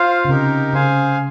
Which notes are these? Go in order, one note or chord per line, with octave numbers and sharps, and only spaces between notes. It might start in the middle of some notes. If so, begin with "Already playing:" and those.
Already playing: F4 C5 F5
C#3
C3 D#4 G4 A#4
C#3 G#4 C5 F5 G#5